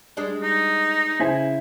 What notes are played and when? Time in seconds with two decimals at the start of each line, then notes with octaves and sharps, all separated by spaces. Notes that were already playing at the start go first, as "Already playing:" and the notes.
0.17 G3 G#3 D4
0.42 D#4
1.20 C#3 E4 C5 G#5